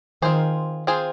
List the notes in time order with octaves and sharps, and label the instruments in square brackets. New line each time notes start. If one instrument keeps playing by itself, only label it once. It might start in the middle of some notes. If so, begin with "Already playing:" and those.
[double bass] D#3 [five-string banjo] C4 F4 G#4 C5
[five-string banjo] C4 F4 G#4 C5